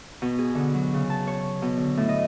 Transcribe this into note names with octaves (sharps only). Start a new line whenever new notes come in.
B2
G#4
D3
F#3
C#3
A5
C#5
B2
D3
A2
D#5